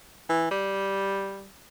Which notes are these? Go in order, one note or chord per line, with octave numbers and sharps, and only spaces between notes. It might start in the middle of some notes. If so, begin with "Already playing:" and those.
E3
G3